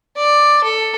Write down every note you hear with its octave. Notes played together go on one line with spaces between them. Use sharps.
D5
A4